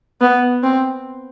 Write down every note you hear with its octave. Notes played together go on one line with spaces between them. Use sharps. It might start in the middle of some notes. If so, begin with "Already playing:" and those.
B3
C4